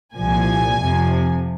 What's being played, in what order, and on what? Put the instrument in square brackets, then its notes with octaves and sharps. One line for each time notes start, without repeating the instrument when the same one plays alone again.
[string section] C2 A#2 F3 G#5
F2 C3 F3